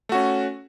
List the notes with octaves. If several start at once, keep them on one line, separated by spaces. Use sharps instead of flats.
A3 C#4 F#4